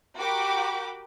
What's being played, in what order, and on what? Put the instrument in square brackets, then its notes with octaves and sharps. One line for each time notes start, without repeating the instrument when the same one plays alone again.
[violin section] F#4 G4 A#4 G5 B5 D6